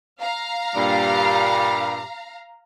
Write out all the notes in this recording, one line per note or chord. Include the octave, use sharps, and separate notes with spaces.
F5 A#5
G2 A#2 G3